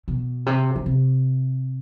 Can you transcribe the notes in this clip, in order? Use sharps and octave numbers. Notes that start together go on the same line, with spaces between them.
B2
C3
D3
C3